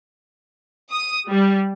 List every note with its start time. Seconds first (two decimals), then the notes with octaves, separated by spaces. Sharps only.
0.91 D#6
1.30 G3